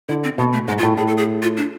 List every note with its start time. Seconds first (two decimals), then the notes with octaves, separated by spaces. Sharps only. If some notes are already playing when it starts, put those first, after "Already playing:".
0.09 D3 E4
0.24 C4
0.38 B2 B3
0.53 A3
0.68 G#2 G#3
0.78 F4
0.83 A2
0.97 A2 G#4
1.07 A4
1.18 G#4
1.42 F4
1.57 D4